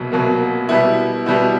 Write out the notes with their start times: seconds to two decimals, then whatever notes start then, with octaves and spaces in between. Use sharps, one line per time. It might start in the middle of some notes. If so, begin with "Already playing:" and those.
Already playing: C2 B2 F#3 A#3
0.12 C2 B2 F#3 A#3
0.69 B2 G3 B3 E4
1.26 B2 G3 B3 E4